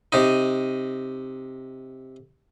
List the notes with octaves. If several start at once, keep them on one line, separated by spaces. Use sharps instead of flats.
C3 D#4